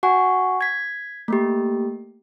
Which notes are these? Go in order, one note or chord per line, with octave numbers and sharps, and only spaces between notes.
F#4 F#5 G#5 C#6
G#6 B6
A3 A#3 G4